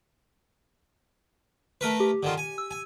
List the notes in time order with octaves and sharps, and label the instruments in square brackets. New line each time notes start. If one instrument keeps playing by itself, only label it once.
[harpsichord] A3 A#4 B4
[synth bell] G4
[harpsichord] D3 D#3 F4
G#5
[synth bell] E6
[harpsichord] G#5